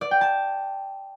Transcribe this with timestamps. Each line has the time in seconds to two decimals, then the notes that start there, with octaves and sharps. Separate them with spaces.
0.01 D5
0.11 G5
0.21 A5